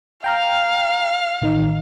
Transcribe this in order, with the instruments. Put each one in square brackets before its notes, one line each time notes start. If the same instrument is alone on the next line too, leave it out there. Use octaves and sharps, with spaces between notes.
[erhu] F5 [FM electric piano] G5 A#5 F6
[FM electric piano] A1 D#3 D#4